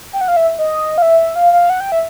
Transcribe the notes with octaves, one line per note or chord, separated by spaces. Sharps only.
G5
F#5
F5
E5
D#5
F5
E5
F5
F5
F#5
G5
E5